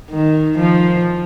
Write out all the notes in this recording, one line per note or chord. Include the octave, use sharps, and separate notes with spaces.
D#3
F3